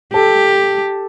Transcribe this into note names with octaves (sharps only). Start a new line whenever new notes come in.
G4 A4